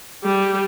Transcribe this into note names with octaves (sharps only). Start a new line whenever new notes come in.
G3